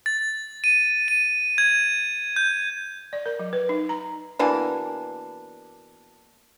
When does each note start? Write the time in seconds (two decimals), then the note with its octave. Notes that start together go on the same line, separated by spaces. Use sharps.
0.06 A6
0.64 D#7
1.08 D#7
1.58 G#6
2.36 G6
3.13 D5
3.26 A#4
3.39 F#3
3.53 B4
3.69 D#4
3.89 A#5
4.39 B2 E3 A#3 D4